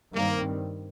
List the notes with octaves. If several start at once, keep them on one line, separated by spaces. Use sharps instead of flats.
G2 D#3 G3 A#3 C4